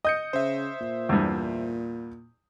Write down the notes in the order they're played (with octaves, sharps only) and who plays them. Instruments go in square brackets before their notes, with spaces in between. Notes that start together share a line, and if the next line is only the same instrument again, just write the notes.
[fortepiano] D#5 [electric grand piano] D#6 G6 C#7
[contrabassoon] C#3 [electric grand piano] C5 E5
[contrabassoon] A#2
[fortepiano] E2 G2